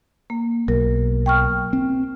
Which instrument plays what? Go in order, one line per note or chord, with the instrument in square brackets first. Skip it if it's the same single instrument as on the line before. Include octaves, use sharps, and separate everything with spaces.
[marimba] A#3
[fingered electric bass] B1 [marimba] A#4
[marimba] G5 C#6 F6
[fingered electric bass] C4